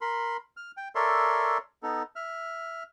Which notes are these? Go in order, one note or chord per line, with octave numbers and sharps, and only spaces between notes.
A#4 B5 C6
F6
G5
A4 A#4 C#5 D5 E5 C6
B3 D#4 A4
E5 F6